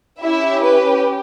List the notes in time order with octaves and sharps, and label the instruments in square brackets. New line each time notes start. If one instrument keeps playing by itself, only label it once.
[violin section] C#4 E4 G4 E5
B4